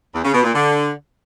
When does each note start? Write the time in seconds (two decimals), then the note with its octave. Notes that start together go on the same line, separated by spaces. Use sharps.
0.14 E2
0.24 C#3
0.34 B2
0.44 A#2
0.54 D3